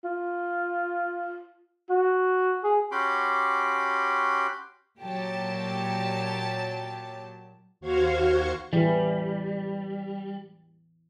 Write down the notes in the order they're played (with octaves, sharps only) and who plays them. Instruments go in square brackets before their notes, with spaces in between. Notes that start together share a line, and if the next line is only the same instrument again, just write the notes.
[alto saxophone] F4
F#4
G#4
[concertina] C#4 F#4 G4 B5 C6 D6
[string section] A#2 F#3 G4 A5
[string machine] D#2 F#4 C5 F5 C#6 G#6
[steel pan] E3 [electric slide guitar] G3